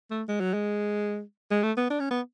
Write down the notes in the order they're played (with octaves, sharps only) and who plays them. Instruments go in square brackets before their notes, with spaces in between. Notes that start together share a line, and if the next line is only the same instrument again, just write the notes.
[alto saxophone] A3
G#3
F#3
G#3
G#3
A3
B3
D4
C#4
B3